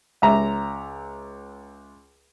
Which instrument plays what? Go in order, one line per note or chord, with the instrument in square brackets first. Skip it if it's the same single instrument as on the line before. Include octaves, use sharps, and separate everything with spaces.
[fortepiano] C#2 E5 A#5